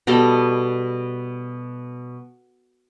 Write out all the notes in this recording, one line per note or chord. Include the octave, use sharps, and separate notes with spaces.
B2 G3 A4 D#5